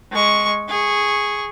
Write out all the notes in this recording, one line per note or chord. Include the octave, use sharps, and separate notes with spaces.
G#3 C#6
G#4 C#6